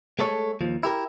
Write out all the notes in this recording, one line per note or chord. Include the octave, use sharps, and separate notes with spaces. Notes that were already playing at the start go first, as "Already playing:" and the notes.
G#3 A3 A4 C#5
D#2 F3
E4 G4 A#4